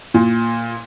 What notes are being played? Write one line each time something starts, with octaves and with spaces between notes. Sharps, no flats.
A#2